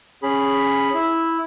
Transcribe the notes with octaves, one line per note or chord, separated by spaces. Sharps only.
C#4 G#4 B5
E4